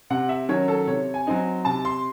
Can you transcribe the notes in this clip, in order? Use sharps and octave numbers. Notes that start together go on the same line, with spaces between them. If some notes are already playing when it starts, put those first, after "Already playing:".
C3 F#5
E5
D#3 F#3 C#4 C#5
A4
C3 C#5
G#5
F#3 C4 D#4
C3 A5
C6